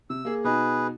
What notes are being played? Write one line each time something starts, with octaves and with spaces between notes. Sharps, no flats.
C3 E6
A#3 G#4
B2 D#4 F#4 G#4 B4